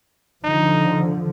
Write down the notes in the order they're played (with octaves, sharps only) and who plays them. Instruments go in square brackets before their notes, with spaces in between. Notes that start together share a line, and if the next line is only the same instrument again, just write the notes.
[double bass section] D3 F3 [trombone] D#4